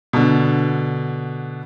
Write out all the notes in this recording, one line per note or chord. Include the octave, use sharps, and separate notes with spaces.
B2 D3